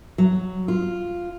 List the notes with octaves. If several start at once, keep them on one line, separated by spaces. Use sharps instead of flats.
F#3
F4